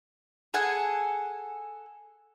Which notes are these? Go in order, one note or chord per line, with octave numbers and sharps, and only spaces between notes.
G#4 A4 F#5 G#5